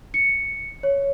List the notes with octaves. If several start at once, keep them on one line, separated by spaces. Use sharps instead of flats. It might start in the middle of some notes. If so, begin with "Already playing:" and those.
C#7
C#5